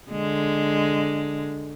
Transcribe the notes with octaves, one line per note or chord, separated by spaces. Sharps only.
D3 G#3